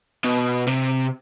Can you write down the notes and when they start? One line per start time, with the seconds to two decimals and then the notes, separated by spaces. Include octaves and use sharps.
0.24 B2
0.67 C3